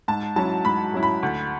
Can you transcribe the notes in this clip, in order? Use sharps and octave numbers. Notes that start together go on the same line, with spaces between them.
G#2 A5
F#3 C#4 E4 A5
G#2 B5
F#3 C#4 E4
B5
D2